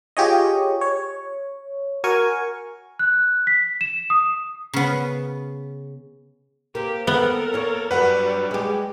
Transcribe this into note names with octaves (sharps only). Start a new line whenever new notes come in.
F4 G4 G#4 C#5 D#5
C#5
F#4 A#4 G#5 C#6
F#6
B6
E7
D#6
C#3 B3
A#3 C4 G4
B3 A4 A#4
E2 A#3 C#5
G2 F#3 G3 B4 F#5
G#3 G4